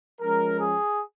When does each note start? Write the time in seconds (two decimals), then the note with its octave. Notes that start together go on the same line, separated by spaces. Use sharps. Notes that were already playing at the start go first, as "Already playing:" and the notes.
0.21 F3 G#3 C#4 A#4
0.61 G#4